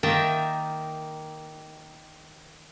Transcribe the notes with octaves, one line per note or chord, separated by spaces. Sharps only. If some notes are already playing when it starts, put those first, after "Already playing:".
D#3 A#3 D#4 E5 G5 A5